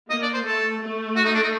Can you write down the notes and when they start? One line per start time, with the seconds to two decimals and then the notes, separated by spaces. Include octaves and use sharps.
0.10 A#3 D#5
0.22 D5
0.34 C5
0.45 A3 A4
0.81 A3
1.16 F#4
1.25 D#4
1.34 D4
1.43 D#4